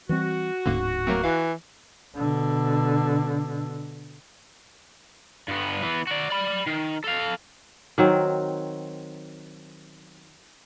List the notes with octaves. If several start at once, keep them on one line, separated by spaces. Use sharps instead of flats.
E3 G3 C4 F#4
D1 G#2 D3 A#3 C#4
F#3 A3 A#3 C4
E3 F5
B2 D3
G2 B3
E3 B3
F#4 D5
D5 B5
D#3
A4 F5
D#3 F#3 C4